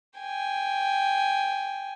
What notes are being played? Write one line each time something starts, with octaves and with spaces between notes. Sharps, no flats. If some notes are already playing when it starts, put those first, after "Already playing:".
G5 G#5